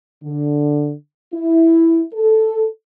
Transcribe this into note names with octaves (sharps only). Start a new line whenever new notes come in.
D3
E4
A4